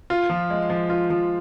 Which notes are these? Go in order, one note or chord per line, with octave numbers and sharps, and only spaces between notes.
F4
F3
G#3
F3
F4
F3